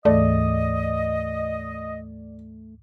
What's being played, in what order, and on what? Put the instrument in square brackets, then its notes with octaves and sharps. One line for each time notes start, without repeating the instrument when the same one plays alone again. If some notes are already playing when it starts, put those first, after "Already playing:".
[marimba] D2 G#2 E3 [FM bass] A3 [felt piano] D5 [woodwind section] D#5